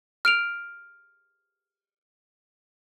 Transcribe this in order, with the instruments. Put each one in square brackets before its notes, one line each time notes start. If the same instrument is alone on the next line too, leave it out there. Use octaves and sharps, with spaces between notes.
[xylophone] F6 D7 F7